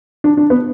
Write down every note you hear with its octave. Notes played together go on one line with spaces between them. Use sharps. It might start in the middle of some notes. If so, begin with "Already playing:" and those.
D4
D4
B3